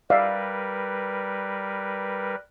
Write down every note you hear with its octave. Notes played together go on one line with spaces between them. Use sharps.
G3 A#4 B4 D5 E5 F5